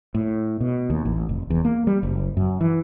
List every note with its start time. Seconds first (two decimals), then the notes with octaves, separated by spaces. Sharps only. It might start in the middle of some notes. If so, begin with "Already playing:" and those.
0.15 A2
0.61 B2
0.90 D#2
1.05 A1
1.29 F1
1.50 E2
1.65 A#3
1.87 G3
2.03 F#1
2.37 F#2
2.61 E3